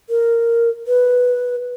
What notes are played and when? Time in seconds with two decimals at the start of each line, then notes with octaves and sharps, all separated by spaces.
0.10 A#4
0.87 B4